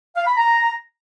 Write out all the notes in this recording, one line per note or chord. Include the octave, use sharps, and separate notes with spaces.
F5
B5
A#5